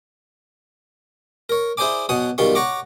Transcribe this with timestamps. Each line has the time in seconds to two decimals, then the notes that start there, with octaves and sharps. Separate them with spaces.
1.49 A#4 C#5
1.77 E4 G#4 C5 D5 G#5 D6
2.09 B2 F#3 F#5 G#5 D#6
2.38 B1 D#3 G3 F4 C6 C#6
2.55 C#5 F#5 A#5 C#6 D6